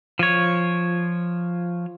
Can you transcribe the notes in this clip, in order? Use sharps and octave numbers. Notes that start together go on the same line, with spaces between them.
F3 C#5